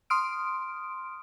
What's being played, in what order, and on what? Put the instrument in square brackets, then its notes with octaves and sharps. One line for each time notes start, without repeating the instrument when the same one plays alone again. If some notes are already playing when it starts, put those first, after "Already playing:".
[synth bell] C6 D#6 F6 D7